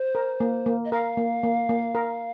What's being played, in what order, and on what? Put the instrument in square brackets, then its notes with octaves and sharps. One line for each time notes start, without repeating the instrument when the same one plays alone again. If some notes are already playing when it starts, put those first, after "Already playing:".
Already playing: [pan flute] C5
[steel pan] A#4
A#3
A#3
[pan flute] D#5
[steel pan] A#4 [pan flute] F5
[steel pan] A#3
A#3
A#3
A#4